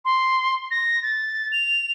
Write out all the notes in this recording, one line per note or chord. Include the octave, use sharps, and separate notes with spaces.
C6
A#6
A6
F7